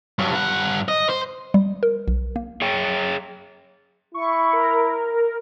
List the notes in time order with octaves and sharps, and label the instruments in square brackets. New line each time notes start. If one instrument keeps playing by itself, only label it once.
[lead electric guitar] G2 F#3
G2 F#5
D#5
C5
[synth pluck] G3
A#4
B1
A#3
[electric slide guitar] G#4 C#5 G5
[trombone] E4 [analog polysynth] C#6
[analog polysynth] A#4